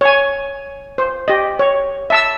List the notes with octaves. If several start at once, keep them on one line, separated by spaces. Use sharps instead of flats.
C#5 G#5
C5
G4 D#5
C#5
E5 A5 E6